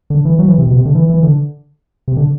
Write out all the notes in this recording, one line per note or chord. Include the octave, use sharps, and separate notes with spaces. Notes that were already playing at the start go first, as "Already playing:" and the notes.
D3
E3
F#3
E3
C3
B2
C3
D3
E3
E3
D3
C3
D3